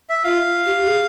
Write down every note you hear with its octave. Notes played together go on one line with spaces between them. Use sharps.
E5
F4 F5
G4
G#4